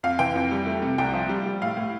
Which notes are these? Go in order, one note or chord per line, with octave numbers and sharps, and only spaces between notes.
F2 F5
E3 G5
F2
G3
A3
C3
C2 G5
F3
G3
G3
A2 F5
A2